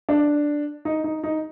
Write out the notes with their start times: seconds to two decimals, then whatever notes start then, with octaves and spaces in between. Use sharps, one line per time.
0.09 D4
0.85 D#4
1.04 D#4
1.23 D#4